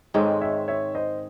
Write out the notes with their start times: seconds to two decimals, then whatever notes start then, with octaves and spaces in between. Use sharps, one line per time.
0.14 G#2 D#3 G#3 C4 A4 C#5
0.41 C#5 E5
0.68 C#5 E5
0.95 C5 D#5